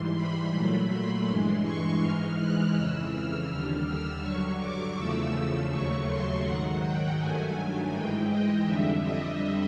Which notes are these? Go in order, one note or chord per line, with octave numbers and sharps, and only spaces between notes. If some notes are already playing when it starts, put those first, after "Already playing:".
Already playing: G#2 E3 G3 C6
B5
A#2 F#3 A3 B5
C6
G2 E3 G#3
C#6
G#2 E3 G#3 F6
F#6
F2 C#3 E3 E6
F6
D#2 D3 G3 F6
E6
G2 D3 F#3 C#6
D6
E2 C#3 F3 A3 E6
E6
D#2 C#3 F#3 A3 C#6
C6
G#2 D#3 F#3 F#5
G5
G2 D#3 F#3 A3 G#5
G#2 E3 G#3 G5
D#5
F2 D3 G3 E5
D#5